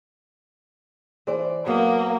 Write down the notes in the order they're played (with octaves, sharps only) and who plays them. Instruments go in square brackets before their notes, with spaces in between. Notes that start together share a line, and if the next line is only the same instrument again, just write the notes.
[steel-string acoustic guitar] E3 C5 D5
[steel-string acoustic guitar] F#3 B3 [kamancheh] A#3